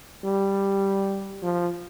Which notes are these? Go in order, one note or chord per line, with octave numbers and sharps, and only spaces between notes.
G3
F3